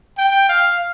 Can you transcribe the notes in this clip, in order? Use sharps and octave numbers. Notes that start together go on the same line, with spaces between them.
G5
F5